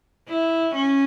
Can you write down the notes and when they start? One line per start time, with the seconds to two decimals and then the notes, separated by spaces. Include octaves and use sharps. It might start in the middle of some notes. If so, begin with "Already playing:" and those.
0.28 E4
0.75 C#4